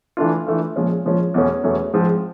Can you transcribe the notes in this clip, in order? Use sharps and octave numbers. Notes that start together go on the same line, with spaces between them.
E3 A3 D4 F4
E3 A3 D4 F4
A#2 F3 G#3 C#4 F4
A#2 F3 G#3 C#4 F4
E2 B2 F#3 A3 C#4
E2 B2 F#3 A3 C#4
G#2 F3 G#3 C4